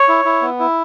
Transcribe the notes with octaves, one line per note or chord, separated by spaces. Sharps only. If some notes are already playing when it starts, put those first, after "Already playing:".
Already playing: C#5
E4
E4
B3
E4